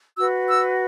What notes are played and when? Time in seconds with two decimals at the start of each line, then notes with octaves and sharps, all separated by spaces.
0.17 F#4 B4 E6
0.50 E6